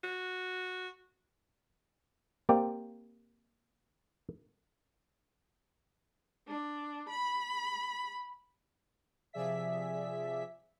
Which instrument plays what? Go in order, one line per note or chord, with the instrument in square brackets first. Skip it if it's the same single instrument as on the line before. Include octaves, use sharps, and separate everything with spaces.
[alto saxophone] F#4
[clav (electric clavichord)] A#3 C4 G4 D5 G5
[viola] D4
B5
[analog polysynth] C3 F3 G#4 D5 E5 B6